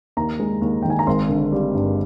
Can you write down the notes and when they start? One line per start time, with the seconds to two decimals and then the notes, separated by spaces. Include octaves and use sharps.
0.17 D#2 A#5
0.40 G#3
0.61 D#2
0.82 D#3 G5
0.90 G#5
0.99 A#5
1.07 G#1 C6
1.29 D3
1.52 G3
1.74 G2